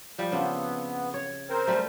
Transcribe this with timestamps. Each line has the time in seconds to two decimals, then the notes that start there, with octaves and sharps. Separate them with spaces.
0.18 F3 G3
0.32 C#3 B3 C4 D4
1.14 C#5
1.49 C4 A#4 C5
1.67 G3 A3